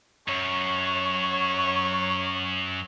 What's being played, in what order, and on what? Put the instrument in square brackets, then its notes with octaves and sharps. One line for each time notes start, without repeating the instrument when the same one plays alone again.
[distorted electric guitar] F#2 [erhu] C#5